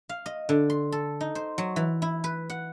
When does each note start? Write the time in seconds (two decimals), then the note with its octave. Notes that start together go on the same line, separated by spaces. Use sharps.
0.09 F5
0.26 D#5
0.49 D3
0.70 C6
0.92 A4
1.21 D#4
1.35 C5
1.58 F#3
1.76 E3
2.02 E4
2.24 B4
2.50 F#5